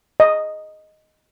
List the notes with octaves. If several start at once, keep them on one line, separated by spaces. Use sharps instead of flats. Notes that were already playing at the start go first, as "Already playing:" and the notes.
D#5